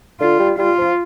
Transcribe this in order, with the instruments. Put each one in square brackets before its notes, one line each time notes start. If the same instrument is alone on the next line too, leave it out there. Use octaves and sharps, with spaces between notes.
[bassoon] D3 [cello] F4
[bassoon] G3
[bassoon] G3 [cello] F4
[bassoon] F3